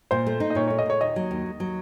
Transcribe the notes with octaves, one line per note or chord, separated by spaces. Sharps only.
A#2 C5
A3
D#4
D#5
A#2 C#5
A3 C#5
D#5
A#2 C#5
D#2 D#5
F#3
D#2
D#2
F#3